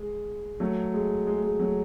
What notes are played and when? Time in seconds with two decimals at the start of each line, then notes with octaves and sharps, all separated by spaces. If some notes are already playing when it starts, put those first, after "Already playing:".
Already playing: G#3
0.60 F#3 A3
0.94 G#3
1.27 G#3
1.43 G#3
1.60 F#3 A3